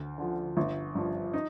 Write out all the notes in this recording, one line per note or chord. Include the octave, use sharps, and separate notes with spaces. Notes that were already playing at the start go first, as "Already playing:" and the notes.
Already playing: D2
D3 F3
G1
G2 F3
D#4